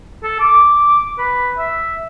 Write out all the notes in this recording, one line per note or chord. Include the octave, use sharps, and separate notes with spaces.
A4
D6
B4
E5